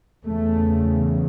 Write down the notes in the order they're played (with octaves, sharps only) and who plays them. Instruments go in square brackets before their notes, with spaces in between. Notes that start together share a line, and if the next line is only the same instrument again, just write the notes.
[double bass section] E2 C#3 A3